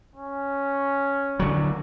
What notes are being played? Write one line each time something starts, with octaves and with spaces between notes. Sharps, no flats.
C#4
D3 F#3